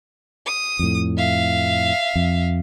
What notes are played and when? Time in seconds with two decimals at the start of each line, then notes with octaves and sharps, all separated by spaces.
0.46 D#6
0.79 F2 A2
1.18 E5 F5
2.16 F2